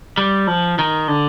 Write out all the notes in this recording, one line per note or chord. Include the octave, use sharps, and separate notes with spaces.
G3
F3
D#3
D3